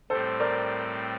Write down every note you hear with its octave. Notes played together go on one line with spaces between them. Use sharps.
A2 G3 C4 A4 C5
A#4 D5